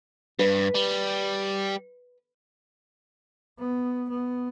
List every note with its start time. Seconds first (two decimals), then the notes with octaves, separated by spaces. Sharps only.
0.39 G2 B4
0.74 G3
3.58 B3
4.10 B3